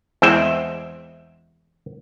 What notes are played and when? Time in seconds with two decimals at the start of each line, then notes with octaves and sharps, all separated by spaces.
0.22 E2 G#3 C4 E4 E5 G5